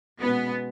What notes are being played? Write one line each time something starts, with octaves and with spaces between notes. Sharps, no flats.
B2 G#3 B3 C#4 F#4 B4